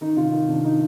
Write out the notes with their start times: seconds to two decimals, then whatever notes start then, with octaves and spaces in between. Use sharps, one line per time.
0.01 D#3 D#4
0.16 C3 F4
0.32 D#3
0.48 C3 D4
0.64 D#3 D#4